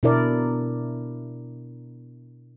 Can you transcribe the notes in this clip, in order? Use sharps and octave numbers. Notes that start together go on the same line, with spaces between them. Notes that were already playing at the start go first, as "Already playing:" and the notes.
B2 D4 E4 A#4 D5